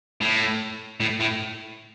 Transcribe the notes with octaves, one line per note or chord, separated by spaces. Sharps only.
A2
A2
A2